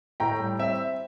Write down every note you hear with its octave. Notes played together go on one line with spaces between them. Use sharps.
A2 G5 A#5
G3
C4 E5 G5